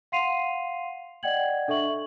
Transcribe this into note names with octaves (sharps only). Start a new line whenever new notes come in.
F5 F#5 C6 C7 D#7 F7
D5 D#5 F#5 G5 G#6 F#7
D4 A4 E5 C#6 F#7